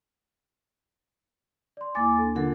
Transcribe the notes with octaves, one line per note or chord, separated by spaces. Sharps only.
D5 C6
D#2 A#3 E4 G#5 D6 A6
D4 A4
D3 F4 A#4 F#5